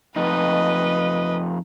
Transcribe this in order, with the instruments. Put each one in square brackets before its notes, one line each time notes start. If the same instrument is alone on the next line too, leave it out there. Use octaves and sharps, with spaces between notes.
[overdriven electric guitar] F2 D#4 [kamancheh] B4 D#5